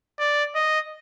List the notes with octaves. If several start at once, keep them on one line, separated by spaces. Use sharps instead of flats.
D5
D#5